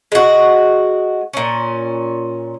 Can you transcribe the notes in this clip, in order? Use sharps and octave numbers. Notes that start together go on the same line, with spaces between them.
G#3 F#4
A#2 C#4